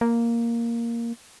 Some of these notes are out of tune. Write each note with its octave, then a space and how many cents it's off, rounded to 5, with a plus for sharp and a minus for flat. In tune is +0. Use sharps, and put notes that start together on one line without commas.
A#3 +0